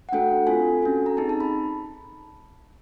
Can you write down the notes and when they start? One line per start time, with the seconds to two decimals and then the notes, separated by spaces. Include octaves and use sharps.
0.09 F#5
0.12 A3 D4 F#4 A4 G5
0.47 C4 F4 A4 G#5
0.82 C#4 F#4 A4
1.06 A#5
1.17 C4 D#4 G#4 A5
1.29 A5
1.40 B5